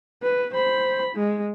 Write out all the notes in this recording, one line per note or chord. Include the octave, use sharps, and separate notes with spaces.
B4
C5 B5
G#3